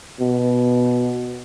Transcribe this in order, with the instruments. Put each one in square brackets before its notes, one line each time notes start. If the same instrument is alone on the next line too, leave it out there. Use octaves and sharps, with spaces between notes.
[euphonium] B2